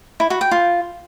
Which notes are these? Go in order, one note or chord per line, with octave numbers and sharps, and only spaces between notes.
E4
F#4
G5
F4